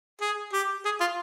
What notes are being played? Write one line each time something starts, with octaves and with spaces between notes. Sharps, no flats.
G#4
G4
G#4
F4